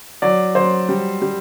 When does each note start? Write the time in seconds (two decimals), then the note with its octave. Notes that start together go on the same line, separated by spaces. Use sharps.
0.22 F#3 D5
0.55 F#3 C5
0.89 G3
1.22 G3